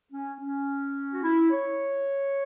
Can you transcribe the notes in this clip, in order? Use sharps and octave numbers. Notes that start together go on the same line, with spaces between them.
C#4
C#4
F#4
E4
C#5